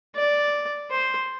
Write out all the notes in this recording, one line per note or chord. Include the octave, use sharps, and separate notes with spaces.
D5
C5